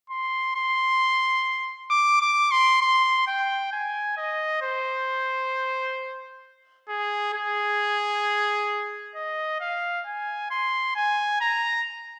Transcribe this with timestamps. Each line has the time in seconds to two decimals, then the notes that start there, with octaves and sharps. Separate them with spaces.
0.10 C6
0.56 C6
1.90 D6
2.21 D6
2.51 C6
2.81 C6
3.27 G5
3.73 G#5
4.17 D#5
4.62 C5
6.89 G#4
7.34 G#4
9.15 D#5
9.60 F5
10.06 G#5
10.51 C6
10.96 G#5
11.41 A#5